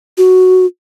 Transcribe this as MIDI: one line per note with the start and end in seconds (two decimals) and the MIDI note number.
0.18 0.66 66